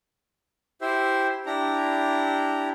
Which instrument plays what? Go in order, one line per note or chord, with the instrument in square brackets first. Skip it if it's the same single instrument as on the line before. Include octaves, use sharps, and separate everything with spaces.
[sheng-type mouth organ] E4 G4 C5 E5
D4 E4 G4 A#5